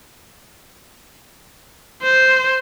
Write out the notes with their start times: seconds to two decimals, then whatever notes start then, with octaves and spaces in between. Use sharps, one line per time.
2.03 C5